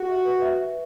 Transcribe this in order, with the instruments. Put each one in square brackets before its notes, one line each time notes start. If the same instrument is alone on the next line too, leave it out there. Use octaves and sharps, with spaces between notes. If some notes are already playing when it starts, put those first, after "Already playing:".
Already playing: [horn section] F#4 [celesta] G4
[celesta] E5
B4
E5
B4